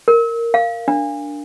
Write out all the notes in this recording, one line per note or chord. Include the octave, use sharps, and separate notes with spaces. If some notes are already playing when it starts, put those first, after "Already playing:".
A#4
F5
D4